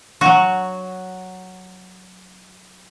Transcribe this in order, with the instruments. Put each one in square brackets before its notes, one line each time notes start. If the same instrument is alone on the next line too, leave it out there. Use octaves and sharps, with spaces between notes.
[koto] F#3 F#4